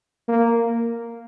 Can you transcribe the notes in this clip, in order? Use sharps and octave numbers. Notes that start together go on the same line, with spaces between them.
A#3